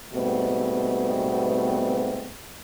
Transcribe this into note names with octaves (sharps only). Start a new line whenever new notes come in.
G#2 B2 G3 A3 B3 C4